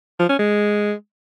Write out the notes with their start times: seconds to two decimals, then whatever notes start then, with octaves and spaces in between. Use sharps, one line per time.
0.19 F3
0.29 C#4
0.39 G#3